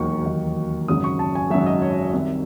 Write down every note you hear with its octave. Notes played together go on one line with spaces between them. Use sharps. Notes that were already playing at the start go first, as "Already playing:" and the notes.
Already playing: E1 D#2 D#3 F#3 C#6
E1 D#2 D#3 F#3
G#1 F#2 C#3 F#3 D#6
C#6
A5
G#5
G#1 F#2 C#3 F#3 E5
D#5
C#5
C2 C3 D#3 E5